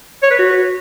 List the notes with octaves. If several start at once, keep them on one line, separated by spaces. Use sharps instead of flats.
C#5
B4
F#4